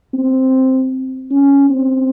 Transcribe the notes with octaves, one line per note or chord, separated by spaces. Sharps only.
C4
C#4
C4